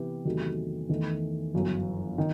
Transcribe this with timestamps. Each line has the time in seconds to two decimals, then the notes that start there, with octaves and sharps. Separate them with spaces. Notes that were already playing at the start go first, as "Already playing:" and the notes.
Already playing: C3 E3 B3 E4 G4
0.25 E2 C3 D#3 F#3 A3
0.89 E2 D#3 A3
1.54 G1 F#2 E3
2.18 D#3